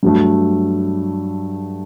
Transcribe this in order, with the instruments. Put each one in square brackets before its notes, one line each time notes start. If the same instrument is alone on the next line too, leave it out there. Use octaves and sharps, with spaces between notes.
[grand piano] G2 F#3 A3